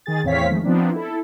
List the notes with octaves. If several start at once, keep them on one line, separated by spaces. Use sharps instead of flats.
D#3 G#4 A6
E2 A2 C4 C#5 F5 B6
D#3 F3 G#3 A3
F3 B3 C4 D4 D#4
E4 A4